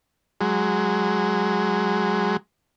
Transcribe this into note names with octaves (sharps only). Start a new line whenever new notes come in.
F#3 G#3